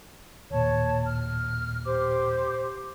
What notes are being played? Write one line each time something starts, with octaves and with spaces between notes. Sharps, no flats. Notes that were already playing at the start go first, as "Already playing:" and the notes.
D#2 A#2 C#5 A5
F6
G4 C5 D6